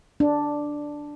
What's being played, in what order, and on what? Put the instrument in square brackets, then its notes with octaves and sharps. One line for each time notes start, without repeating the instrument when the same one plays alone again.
[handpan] D4